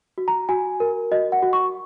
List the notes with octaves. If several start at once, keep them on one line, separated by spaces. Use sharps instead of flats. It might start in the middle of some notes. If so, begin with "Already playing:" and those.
F#4
A#5
F#4 G#5
A#4
F#4 D#5
F#5
F#4
C#6